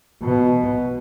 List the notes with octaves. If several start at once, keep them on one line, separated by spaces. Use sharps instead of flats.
B2